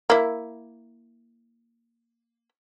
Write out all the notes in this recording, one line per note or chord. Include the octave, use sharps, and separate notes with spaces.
A#3 E4